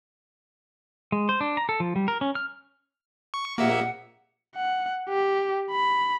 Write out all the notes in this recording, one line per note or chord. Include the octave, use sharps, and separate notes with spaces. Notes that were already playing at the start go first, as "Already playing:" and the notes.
G#3
C5
D4
A#5
A4
F3
G3
A#4
C#4
F6
C#6
A#1 F2 A#3 G4 E5 F#5
F#5
G4
B5